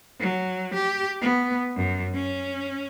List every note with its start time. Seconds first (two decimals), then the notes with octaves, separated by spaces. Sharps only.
0.20 F#3
0.74 G4
1.21 B3
1.76 F#2
2.15 C#4